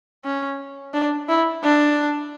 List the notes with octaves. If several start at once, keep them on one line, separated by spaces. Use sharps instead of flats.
C#4
D4
E4
D4